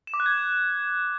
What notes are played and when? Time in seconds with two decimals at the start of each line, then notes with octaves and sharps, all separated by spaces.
0.07 E7
0.14 D6
0.20 F#6
0.26 G#6